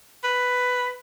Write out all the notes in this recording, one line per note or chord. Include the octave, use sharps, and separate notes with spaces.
B4